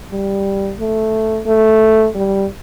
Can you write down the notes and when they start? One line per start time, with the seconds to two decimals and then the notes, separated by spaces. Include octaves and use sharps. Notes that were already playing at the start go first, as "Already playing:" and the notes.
0.12 G3
0.80 A3
1.47 A3
2.15 G3